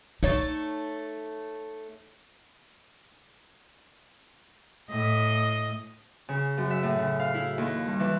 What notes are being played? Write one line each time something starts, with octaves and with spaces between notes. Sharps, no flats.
A3 D#4 C#5 A5
A2 D#5
C#3
F#2
E5
A2
C#3
F5
E4
D#2
G2
E3